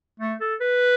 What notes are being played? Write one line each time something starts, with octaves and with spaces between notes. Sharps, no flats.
A3
A4
B4